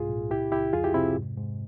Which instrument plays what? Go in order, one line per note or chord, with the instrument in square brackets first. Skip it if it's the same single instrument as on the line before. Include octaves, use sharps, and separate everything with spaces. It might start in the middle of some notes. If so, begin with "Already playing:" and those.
Already playing: [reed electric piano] C2 G#2 F4 G#4
A#2
C#2 E4 G4
C#2 E4 G4
F2 F4 G#4
E4 G4
C3 C4 E4
G#2
G#2